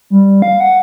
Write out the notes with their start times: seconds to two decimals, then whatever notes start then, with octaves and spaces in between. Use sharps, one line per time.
0.10 G3
0.42 F5
0.60 F#5